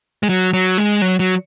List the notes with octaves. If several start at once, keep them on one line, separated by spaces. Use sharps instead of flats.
G#3
F#3
F#3
G#3
F#3
F#3